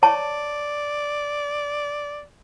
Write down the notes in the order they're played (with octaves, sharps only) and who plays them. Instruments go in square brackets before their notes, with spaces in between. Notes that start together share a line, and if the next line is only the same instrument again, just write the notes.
[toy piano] C#5 A5 C#6 [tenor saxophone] D5